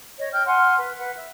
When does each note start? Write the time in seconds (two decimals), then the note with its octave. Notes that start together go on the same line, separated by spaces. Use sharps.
0.17 C#5 D#5
0.32 G5 F6 G6
0.46 F#5 G#5 C6 F6
0.78 B4
0.99 B4 F#5
1.15 E5